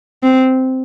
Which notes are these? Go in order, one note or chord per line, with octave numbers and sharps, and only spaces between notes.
C4